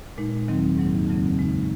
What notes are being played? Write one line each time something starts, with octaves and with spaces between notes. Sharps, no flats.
A#2 G#3 D#4
D#2 D#3 F#3 C4 D#4
G#2 F#3 A#3 D#4
F2 C#3 F#3 C4
C#3 G#3 D#4